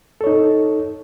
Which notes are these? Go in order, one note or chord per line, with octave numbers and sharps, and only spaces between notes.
D#4 A4 C#5